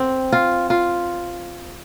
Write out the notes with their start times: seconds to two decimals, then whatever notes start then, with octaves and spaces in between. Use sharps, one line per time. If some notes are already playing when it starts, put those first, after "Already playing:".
Already playing: C4
0.32 F4
0.70 F4